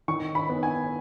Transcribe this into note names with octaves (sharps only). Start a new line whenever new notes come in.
D#3 C#6
B5
B3
G#5